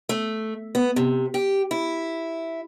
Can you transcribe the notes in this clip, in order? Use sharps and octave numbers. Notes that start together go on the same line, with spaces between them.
A3
B3
C3
G4
E4